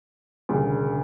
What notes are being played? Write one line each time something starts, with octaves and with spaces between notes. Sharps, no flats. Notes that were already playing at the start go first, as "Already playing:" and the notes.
E1 D2 C#3 G3